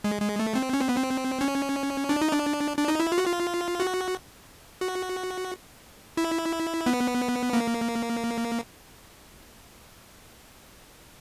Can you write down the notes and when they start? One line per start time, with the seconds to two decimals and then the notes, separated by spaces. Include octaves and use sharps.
0.04 G#3
0.22 G#3
0.40 A3
0.55 C4
0.73 C#4
0.81 C4
0.89 B3
0.96 C4
1.41 C#4
2.09 D4
2.22 D#4
2.32 D4
2.78 D4
2.88 D#4
3.00 E4
3.12 F4
3.18 F#4
3.26 F4
3.80 F#4
4.81 F#4
6.17 E4
6.86 B3
7.53 A#3